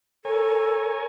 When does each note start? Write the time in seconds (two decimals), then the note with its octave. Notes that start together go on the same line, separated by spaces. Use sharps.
0.25 A4 A#4 C#5 G#5